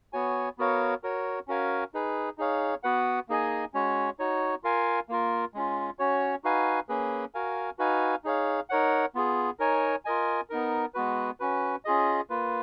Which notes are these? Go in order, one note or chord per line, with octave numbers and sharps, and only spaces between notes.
B3 F#4 C#5 G#5
B3 F#4 A#4 C#5 F5
F#4 A#4 C#5
C#4 F#4 A#4 F5 G#5
D#4 G#4 B4
D#4 G#4 C#5 F5
B3 F#4 B4 F#5
A#3 D#4 G#4 D#5 G#5
G#3 C#4 F#4 C#5
D#4 F#4 C#5
F4 A#4 F5 G#5
A#3 F4 A#4
G#3 C#4 F4
C#4 F#4 C#5
D#4 F#4 B4 F5 G#5
A#3 C#4 G#4 B4
F#4 A#4 F5 G#5
D#4 F#4 B4 F5 G#5
D#4 G#4 C#5 F5
D#4 A#4 C#5 F#5
B3 F4 G#4
D#4 A#4 C#5 G#5
F4 A#4 D#5 G#5
B3 D#4 A#4
G#3 B3 F#4 B4
C#4 F#4 B4
C#4 F4 G#4 D#5
A#3 F4 B4